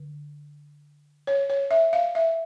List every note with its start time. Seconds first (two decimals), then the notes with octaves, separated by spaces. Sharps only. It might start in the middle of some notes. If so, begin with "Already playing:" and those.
Already playing: D3
1.27 C#5
1.50 C#5
1.71 E5
1.93 F5
2.15 E5